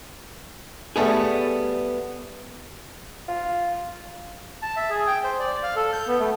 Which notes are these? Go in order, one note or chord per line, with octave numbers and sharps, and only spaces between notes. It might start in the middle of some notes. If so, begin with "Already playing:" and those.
G3 A3 B3 G#4
F4
A5
E5
G#4
G5
C5
D5
F5
A4
G6
B3
A3